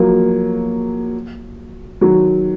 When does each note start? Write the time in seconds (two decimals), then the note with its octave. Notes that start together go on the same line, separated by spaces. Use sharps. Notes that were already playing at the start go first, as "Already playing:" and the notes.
Already playing: F3 F#3 A#3
2.01 D#3 F#3